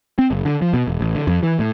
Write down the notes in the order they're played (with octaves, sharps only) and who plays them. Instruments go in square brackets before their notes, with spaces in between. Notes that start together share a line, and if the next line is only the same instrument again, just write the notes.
[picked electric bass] C4
F#1
D3
F3
B2
E1
A1
D3
F2
E3
A2